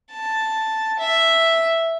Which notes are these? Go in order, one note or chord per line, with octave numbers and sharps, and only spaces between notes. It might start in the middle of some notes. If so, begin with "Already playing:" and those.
A5
E5